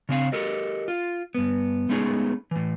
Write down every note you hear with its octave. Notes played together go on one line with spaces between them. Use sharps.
C#3 C4 F5
G4 A4 A#4 D#5
F4
G2 B3
G#3 A3 B3 C#4 D#4 G#4
A2 E3